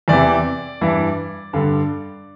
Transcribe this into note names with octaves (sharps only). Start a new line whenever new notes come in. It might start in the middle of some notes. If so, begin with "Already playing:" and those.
E2 C3 E3 D5
G2 E3
G2 D3